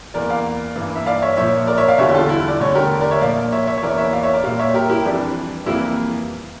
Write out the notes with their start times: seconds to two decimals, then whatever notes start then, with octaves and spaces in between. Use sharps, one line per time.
0.14 E2 E3 A#3 A#4 D5
0.29 D5 F5
0.76 G2 E3 A#3
0.96 E5
1.06 D5 F5
1.22 C#5 E5
1.37 A#2 F3 A#3 C#5 E5
1.67 A#4 D5
1.78 C#5 E5
1.88 D5 F5
1.98 E2 D3 G3 C#5 E5
2.09 G4
2.14 F4 A4
2.29 E4
2.48 D5
2.60 E2 D3 A3 C#5
2.75 G4 A#4
3.00 A#4 D5
3.11 C#5 E5
3.21 A#2 F3 A#3 D5 F5
3.52 C#5 E5
3.67 C#5 E5
3.78 C#5
3.82 E2 E3 A#3 A#4 D5
3.97 C#5 E5
4.13 D5 F5
4.23 C#5 E5
4.33 A#4 D5
4.43 A#2 G3 A#3 D5 F5
4.59 C#5 E5
4.74 G4 A#4
4.90 E4 G4
5.05 F2 E3 G3 D4
5.66 F2 E3 G3 A#3 E4